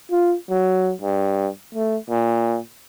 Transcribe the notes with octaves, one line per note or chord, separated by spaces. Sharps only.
F4
F#3
G2
A3
A#2